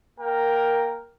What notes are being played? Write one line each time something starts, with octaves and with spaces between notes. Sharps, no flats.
A#3 A#4 G5